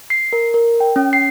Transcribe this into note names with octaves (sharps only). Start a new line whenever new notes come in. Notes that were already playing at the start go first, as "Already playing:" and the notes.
C7
A#4
A#4
G5
C#4
C7